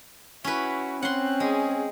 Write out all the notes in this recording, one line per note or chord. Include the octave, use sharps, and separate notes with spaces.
C#4 E4 F#4 B4
C4 C#4 F#5 C6 F#6
G#3 G#4